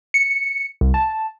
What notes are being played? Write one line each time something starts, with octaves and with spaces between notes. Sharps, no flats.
C#7
C2
A5